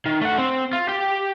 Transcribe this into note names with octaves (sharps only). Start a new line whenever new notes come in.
D#3
A3 F#5
C4
F4
G4